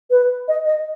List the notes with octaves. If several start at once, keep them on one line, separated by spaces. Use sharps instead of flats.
B4
D#5
D#5